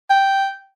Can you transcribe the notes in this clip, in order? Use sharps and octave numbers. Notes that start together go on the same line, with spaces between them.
G5